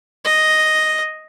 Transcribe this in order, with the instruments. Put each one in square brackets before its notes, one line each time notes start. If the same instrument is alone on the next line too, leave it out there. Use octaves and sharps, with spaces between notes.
[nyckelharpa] D#5